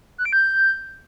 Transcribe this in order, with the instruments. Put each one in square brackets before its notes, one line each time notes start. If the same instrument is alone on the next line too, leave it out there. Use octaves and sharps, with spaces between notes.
[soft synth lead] F#6
D7
G6